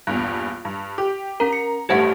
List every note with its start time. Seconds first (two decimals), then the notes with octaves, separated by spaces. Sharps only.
0.07 A#1 E2 G2 F#6
0.65 G2
0.98 G4 D6
1.40 C#4 A#4 A#5
1.53 C#7
1.89 A1 G2 A3 G4 C5 F#5